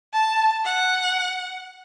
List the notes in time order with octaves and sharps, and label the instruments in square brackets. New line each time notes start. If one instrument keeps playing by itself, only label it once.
[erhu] A5
F#5